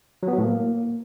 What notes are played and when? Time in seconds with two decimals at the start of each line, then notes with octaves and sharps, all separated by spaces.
0.23 F#3
0.28 B3
0.33 F#3
0.38 A2
0.43 A#3